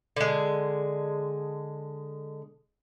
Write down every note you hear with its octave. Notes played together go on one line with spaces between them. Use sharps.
D3 G#3